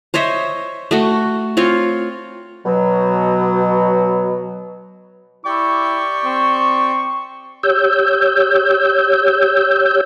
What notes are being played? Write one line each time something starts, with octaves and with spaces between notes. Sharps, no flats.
C5 C#5 D#5 E5
A3 F#4
C4 F4 C#5
B2 F#3
E4 G4 D5 G5 C#6
C4
G4 C#5 E6 G6